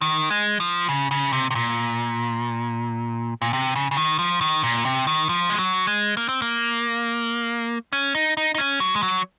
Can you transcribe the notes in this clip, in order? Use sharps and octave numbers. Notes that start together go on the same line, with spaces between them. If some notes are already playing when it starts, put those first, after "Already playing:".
D#3
G#3
F3
C#3
C#3
C3
C3
A#2
A#2
C3
C#3
C#3
D#3
F3
D#3
A#2
C3
D#3
F3
G#3
F#3
G#3
A#3
C4
A#3
C#4
D#4
D#4
D#4
C#4
F#3
G#3
F#3